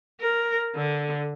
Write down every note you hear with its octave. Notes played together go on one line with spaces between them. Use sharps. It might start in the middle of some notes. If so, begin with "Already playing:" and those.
A#4
D3